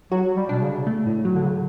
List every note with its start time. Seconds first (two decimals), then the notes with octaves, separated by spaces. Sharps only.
0.12 F#3 F#4
0.37 G3
0.49 B2 D4
0.62 C#3
0.87 A3
1.06 A2
1.25 F#3
1.35 D3
1.43 C#3